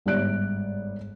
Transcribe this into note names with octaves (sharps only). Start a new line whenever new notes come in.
G1 G#2 G3 D5 F#6 D7